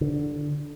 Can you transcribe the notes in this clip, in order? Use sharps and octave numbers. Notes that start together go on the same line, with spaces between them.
D3